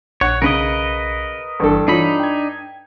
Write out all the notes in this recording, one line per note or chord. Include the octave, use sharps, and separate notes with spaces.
A#1 C#5 F#5
B1 C#3 A#4 B4 D#5 C#7
G1 G2 E3 A4 C#6
E3 D4 D#4 F4 C#5 B5
G5 G#6